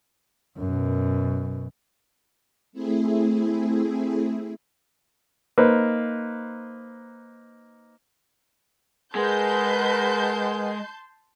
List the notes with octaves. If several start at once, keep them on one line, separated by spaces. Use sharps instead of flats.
F#2 B2
A3 C4 E4 G#4
A#3 D#4 B4 C5
G#3 A#4 B4 F#5 A5 C6 G6